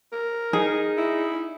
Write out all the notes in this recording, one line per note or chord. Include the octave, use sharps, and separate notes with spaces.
A#4
D#4 G#4
E4